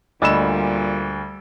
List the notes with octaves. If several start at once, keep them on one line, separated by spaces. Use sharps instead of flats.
D2 A#2 G3 D5 D#5 B5 E6 E7